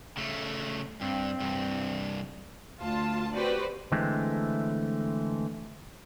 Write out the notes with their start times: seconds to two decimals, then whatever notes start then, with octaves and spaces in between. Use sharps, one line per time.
0.17 C#3 A3
1.01 G2 C4
1.40 C2 G2
2.81 D2 F4 A5
3.35 C4 F#4 G4 B4 C5 D5
3.92 D3 E3 G#3 A3 C4